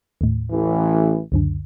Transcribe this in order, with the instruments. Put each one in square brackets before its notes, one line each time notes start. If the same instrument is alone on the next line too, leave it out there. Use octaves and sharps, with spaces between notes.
[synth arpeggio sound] D#2 A2
[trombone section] A1 E3
[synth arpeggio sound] C#2 F#2 D3